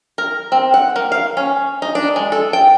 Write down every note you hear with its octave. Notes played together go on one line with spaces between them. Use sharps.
A#4
C4
F#5
A#3
F5
C#4
D#4
D4
G#3
A4
G5